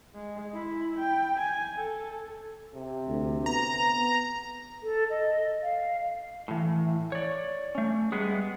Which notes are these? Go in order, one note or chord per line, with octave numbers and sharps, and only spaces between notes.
G#3
E4
G5
G#5
A4
C3
D2
B3 A#5
A4
D#5
F5
A2 E3
C#5 D5
A3 C#4
G3 G#3 B3 G#4